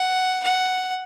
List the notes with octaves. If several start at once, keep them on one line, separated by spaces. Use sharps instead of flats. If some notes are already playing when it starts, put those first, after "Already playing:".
Already playing: F#5
F#5